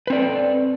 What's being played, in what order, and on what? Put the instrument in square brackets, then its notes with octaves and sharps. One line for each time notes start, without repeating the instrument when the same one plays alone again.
[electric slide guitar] B4
C4
D5
A4